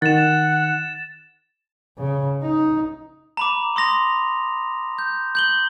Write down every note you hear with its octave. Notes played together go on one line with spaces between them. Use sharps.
D#3 F#5 A6 E7
C#3
D#4
A#5 B5 D6
C6 D#6 A#6 F7
G6
G6 F#7 G7